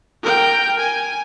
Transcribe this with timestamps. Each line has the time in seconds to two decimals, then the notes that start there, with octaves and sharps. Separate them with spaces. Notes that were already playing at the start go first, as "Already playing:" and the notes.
0.23 A#4 G5
0.79 G#5